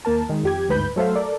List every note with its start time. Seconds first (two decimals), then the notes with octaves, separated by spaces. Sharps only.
0.05 D#2 A#3 A#4 A5
0.29 D#3 G#3
0.43 F2 G4 G#6
0.68 G1 D2 G#2 B4 B5 G6
0.96 F#3 A3 A4 C5 E5 F5
1.16 A4 A#4 D5